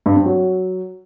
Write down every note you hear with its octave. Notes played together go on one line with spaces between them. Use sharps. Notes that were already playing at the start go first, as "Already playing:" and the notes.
G2
C4
F#3